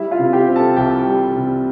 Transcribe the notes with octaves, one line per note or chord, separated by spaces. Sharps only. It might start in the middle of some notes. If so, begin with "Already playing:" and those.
Already playing: G3 E4 E5
F4 F5
C3
G4 G5
C4
A4 A5
C2 G4 G5
G3
C3